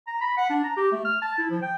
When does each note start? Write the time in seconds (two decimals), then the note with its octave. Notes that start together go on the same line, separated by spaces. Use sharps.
0.07 A#5
0.21 B5
0.37 F#5
0.50 D4
0.64 A#5
0.77 G4
0.92 A3
1.05 F6
1.22 A5
1.38 E4
1.51 F3
1.62 G5